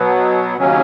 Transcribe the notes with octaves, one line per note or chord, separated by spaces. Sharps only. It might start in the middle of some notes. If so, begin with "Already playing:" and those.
Already playing: B2 F#3 B3
D#2 C#3 F#3 C#4